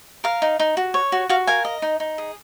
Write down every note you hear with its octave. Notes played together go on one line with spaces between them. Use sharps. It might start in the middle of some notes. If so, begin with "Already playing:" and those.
A#4 F5
D#4
D#4
F#4
C#5
F#4
F#4 F5
A#4 F5 G#5
D#5
D#4
D#4
G#4